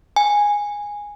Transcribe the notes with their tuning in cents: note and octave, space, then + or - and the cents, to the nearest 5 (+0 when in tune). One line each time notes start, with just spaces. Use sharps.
G#5 -10